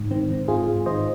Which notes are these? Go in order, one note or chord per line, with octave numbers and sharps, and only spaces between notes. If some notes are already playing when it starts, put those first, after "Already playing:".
Already playing: G#2
D#3 C4
D#3
G#2 F4 G#4
G#2
D#3 C5 D#5